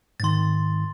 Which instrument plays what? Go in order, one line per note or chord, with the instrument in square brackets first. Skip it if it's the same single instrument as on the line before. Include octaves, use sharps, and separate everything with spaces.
[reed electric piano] G#2 D#3 [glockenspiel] C6 A6